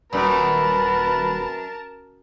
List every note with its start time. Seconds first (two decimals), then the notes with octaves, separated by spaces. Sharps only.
0.13 D#1 F#2 A#4 B4 A5